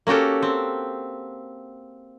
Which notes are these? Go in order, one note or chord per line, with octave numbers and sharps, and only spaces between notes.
A#3 C#4 F#4 G4 A4
C4